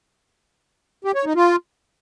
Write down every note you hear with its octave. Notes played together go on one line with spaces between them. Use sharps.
G4
C#5
D#4
F4